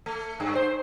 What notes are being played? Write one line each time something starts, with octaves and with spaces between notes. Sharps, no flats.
A3
G2
C5